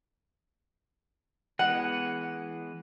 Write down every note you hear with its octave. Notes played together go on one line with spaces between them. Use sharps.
E3 G#3 B3 F#5